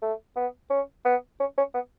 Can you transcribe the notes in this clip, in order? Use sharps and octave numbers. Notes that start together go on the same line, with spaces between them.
A3
B3
C#4
B3
C#4
C#4
B3